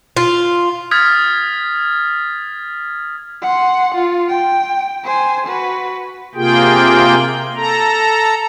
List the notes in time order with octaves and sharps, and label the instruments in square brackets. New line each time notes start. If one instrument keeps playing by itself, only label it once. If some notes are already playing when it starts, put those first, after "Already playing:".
[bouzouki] F4
[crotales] D#6 F6 G#6 A6 B6
[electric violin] F#5 C6
F4
G5
C5 G#5
F#4 B4
[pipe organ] C3 A#3 F4 G#4 G5
A4 A#5